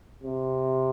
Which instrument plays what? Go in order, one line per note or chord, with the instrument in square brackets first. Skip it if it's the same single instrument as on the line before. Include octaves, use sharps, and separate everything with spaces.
[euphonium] C3